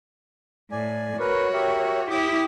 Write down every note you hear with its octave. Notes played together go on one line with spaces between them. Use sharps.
A2 D5 G#5
F#4 A#4 B4 C#5
G4 A#4 E5
E4 G4 G5 D6 D#6